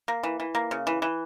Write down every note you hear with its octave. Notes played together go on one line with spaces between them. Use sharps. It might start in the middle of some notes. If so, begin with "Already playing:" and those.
A#3
E3
E3
A#3
C#3
E3
E3